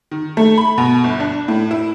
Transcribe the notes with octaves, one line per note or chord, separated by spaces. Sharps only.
D#3
A3
B5
B2
G1
D4
A2
E4